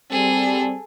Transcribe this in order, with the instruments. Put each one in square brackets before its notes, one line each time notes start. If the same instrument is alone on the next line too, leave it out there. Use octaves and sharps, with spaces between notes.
[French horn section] G3 C4 [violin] G#4 A4